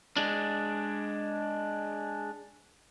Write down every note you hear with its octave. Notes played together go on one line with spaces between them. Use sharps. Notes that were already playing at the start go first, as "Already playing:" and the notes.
G#3 D4